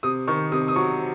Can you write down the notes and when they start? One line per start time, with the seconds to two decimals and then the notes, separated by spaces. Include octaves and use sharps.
0.03 C3 D#6
0.28 D#3 C#6
0.52 C3 D#6
0.68 D#6
0.76 F#3 C#6